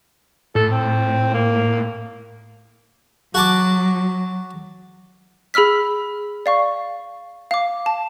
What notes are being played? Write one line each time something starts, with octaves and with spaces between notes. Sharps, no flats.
A2 A4
C4
A#3
F#3 F#4 A5 D6
G#4 B5 E6 F6 B6
D5 F5 C#6
F5 D6
A5